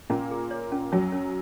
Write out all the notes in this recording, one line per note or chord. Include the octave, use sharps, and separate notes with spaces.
A#2 A#3 C#4
G#4
C#5
C#4
F#2 F#3 C#4
C#4